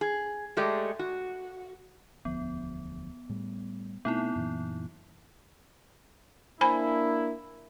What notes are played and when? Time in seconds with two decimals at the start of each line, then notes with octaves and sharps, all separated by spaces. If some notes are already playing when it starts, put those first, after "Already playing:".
0.01 G#4
0.57 G#3 A3 G4 A4 D5 D#5
0.99 F#4
2.25 E1 D2 F3 B3
3.29 A2 G3
4.05 B2 A3 B3 C4 D#4 E4
4.36 F#2 A#2 E3
6.61 A#3 D4 E4 C5 G#5 B5